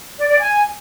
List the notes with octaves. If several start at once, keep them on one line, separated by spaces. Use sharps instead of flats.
D5
D5
G#5